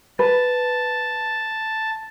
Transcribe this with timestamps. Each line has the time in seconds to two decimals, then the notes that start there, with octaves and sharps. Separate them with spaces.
0.19 B4 A5